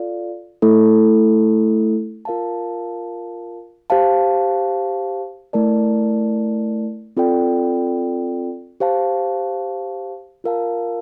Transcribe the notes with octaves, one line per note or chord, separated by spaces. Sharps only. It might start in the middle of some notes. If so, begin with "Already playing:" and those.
Already playing: F4 A4 D5 F5
A3 E4 A4
F4 A#4 F5 A5
G4 C5 F5 A5
A3 E4 A#4 D5 A5
C4 F4 A4 D5 G5
G4 C5 F5 A5
F4 A#4 F5 A5